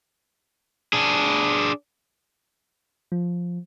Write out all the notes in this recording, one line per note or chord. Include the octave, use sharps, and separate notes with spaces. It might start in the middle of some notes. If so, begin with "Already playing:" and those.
D4 G#4
F3